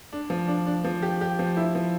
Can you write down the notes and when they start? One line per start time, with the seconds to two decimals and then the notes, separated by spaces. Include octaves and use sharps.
0.13 D4
0.30 F3
0.48 D4
0.66 D4
0.84 F3
1.02 G4
1.21 G4
1.39 F3
1.57 E4
1.75 F3